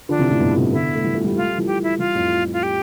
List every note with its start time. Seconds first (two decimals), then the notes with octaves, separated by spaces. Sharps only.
0.09 D3 F3 D4
0.19 C3 E3
0.29 A2 C3
0.40 G2 B2
0.57 A2 C3
0.72 B2 D3 E4
0.95 A3
1.04 E3 G3
1.15 F3 A3
1.25 E3 G3
1.36 A3 F4
1.43 G3
1.50 F3
1.58 E3 G3
1.67 G4
1.83 E4
1.99 E3 G3 F4
2.15 F2 A2
2.53 F4
2.63 G4